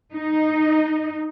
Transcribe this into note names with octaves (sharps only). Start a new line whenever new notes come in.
D#4